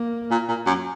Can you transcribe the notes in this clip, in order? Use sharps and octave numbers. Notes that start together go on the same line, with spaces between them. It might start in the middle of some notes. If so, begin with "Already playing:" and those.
Already playing: A#3
A#2
A#2
F#2